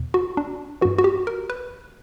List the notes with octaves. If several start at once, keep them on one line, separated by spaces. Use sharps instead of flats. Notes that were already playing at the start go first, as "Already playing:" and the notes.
Already playing: E2 B2
F#4
D4
G2 E3 F#4
F#4
G4
A#4
B4